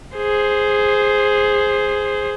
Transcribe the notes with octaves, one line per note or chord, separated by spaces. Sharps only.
G#4 C5